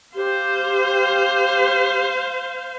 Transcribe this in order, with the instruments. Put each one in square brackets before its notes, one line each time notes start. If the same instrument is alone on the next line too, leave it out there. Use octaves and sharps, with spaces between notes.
[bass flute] G4 [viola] C5 F5